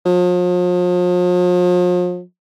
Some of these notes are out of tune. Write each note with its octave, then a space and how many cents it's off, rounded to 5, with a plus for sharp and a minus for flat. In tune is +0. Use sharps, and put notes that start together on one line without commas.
F3 +40